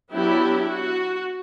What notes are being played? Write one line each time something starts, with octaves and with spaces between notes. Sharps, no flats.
F#3 B3 D4 E4 G4
F#4